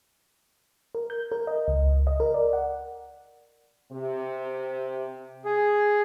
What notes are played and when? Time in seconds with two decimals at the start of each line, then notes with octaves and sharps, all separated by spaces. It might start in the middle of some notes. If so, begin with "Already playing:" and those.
0.95 A#4
1.10 G6
1.32 A#4
1.47 D#5
1.68 C#2
2.07 D#5
2.20 A#4
2.34 D5
2.53 F#5
3.92 C3
5.45 G#4